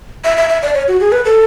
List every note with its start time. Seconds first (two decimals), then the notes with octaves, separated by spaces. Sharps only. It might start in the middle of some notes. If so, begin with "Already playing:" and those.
0.24 E5
0.37 E5
0.49 E5
0.62 D5
0.74 C#5
0.88 F#4
1.00 G#4
1.12 B4
1.25 A4